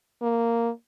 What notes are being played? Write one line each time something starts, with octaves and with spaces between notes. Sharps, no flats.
A#3